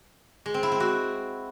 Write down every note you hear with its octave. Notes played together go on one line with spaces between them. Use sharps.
G#3
C4
E4
C4
F#4